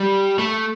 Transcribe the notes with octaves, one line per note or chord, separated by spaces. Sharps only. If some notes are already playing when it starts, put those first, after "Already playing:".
Already playing: G3
A3